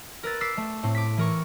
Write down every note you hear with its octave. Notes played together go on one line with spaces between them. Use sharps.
A#4 B4 E6 A6
D6 E6 B6 C7
A3
A2 C4
D6 B6
E3 A#4 C#6